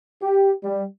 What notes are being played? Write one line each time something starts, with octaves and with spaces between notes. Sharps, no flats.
G4
G3